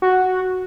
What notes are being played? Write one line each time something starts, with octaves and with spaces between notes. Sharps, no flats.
F#4